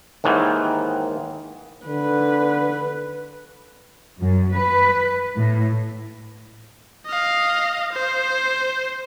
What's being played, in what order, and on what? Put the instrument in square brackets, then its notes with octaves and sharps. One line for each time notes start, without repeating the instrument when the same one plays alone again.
[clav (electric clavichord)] D#2 G#2 D#3 E3
[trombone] D3 [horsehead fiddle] B4
[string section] F#2
B4
A2
[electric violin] D#5 F5
C5